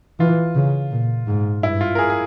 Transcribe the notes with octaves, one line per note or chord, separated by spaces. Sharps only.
E3 F4
C#3
A#2
G#2
G2 E4
F4
A#4
G#4
G#4